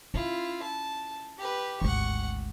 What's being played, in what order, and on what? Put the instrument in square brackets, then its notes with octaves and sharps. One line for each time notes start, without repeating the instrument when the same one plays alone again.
[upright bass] C#4 [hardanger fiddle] E4 F4
[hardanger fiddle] A5
G4 B4
[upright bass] G#1 D2 [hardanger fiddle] F#5 C#6